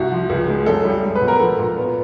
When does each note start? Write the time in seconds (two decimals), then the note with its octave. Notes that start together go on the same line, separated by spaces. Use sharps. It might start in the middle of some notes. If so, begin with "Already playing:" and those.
Already playing: C2 F#4
0.12 F3
0.29 C#2
0.48 G#3
0.66 F#2 A4
0.85 G3
1.03 G#3
1.16 B4
1.21 B2
1.28 A#4
1.40 F3 A4
1.58 A#2
1.77 B3